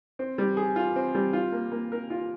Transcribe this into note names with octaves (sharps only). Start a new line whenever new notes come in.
C4
G3
G#4
F4
C4
G3
F4
A#3
A#3
A#4
F4